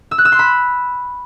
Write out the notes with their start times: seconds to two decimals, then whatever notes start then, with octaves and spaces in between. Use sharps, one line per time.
0.11 E6
0.18 F#6
0.25 E6
0.32 C6
0.39 B5